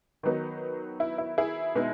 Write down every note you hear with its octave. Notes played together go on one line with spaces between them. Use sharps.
D#3 F#3 B3 D#4
E4
E4
E4 G#4
B2 G#3 B3 D#4